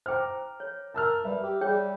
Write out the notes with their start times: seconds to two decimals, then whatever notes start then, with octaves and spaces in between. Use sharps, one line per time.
0.06 C5 G5 A#5 D6 F6
0.60 C#5
0.94 A#4 A5 E6 F6
1.25 G3 B4 E5
1.42 G4
1.61 G3 G#4 C#5 G5